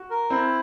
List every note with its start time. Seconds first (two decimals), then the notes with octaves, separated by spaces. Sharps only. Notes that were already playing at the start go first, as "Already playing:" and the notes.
Already playing: F#4
0.10 A#4
0.30 C4 E4